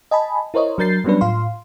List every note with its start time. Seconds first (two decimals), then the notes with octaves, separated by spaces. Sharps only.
0.11 D#5 G#5 A5 B5
0.54 E4 A#4 C5 C#5 D#5
0.78 F#3 D4 A#4 G6 A6 C7
1.04 F#3 G3 B3 C#4 D4 B4
1.21 A2 F4 F5 C6